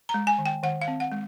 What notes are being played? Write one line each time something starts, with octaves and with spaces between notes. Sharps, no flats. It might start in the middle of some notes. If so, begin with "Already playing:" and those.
A#5
G#3
G#5
D#3
G5
D#3 F#5
F5
C4
F#5
G#3